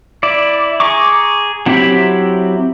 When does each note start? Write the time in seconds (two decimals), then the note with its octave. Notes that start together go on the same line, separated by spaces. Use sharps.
0.23 E4 D5
0.80 G#4 A#5 C#6 D6
1.66 F#3 C4 E4 G4 B5